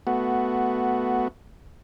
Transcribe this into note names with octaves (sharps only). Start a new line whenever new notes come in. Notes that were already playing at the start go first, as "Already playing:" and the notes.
A3 B3 F#4